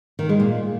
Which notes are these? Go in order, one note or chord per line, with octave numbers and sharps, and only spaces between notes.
D#3
G#3
A#2